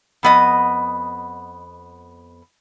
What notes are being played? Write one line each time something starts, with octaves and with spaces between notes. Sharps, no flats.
F2 B3 D#5